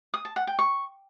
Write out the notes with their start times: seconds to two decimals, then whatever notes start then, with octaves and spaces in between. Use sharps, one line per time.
0.14 D#6
0.25 A5
0.36 F#5
0.47 G5
0.59 C#6